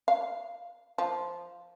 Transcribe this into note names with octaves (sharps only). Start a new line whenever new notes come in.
F5
F3